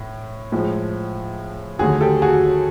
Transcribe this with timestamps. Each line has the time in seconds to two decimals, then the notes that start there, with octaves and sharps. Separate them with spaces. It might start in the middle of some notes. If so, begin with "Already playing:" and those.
Already playing: A2
0.52 A2 F3 G#3
1.79 D#2 D3 F#3 A3 F#4 G#4
2.01 G4 A4
2.22 F#4 G#4